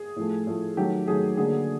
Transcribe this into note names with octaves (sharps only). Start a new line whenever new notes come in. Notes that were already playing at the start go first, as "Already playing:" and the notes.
Already playing: G#4
A2 F3 A3
A2 F3 A3
D#3 F#3 A3 G4
D#3 F#3 A3 G#4
D3 F#3 A#3 G#4